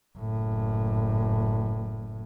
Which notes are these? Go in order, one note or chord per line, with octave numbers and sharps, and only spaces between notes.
F#1 A2